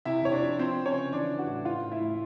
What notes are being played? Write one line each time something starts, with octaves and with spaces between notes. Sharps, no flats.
C3 E4 E5
C3 C#5
D4 D5
F3
F3 C4 C5
F3
C#4 C#5
C#3
E3 D4 D5
E3
F#4 F#5
A2
A2 F4 F5
A2
E4 E5
A2